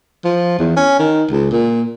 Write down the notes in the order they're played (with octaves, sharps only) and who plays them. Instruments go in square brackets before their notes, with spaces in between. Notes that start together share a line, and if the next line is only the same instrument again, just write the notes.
[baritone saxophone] F3
E2
C#4
D#3
C#2
A#2